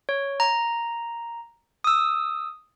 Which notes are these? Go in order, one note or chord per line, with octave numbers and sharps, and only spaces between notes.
C#5
A#5
D#6 E6